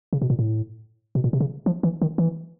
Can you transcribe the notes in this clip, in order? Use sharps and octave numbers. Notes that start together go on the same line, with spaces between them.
C#3
B2
A#2
A2
B2
A#2
C3
C#3
F3
E3
D#3
E3